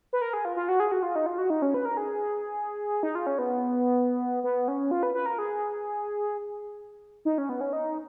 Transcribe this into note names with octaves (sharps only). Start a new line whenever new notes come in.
B4
A#4
G#4
F4
F4
F#4
G#4
F#4
F4
D#4
F4
F#4
D#4
C#4
B4
A#4
G#4
D#4
F4
C#4
B3
B3
C#4
F4
B4
B4
A#4
G#4
D#4
C#4
B3
C#4
D#4